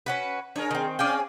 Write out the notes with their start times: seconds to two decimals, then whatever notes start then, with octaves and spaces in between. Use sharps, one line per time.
0.06 C#4 F#4 B4
0.56 D4 G#4 A#4 C#5
0.71 D#3 C4
0.99 C4 C#4 G#4 D5 F5 G5